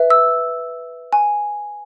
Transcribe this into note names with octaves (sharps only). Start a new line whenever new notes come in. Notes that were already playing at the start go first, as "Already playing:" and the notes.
Already playing: B4 E5
E6
G#5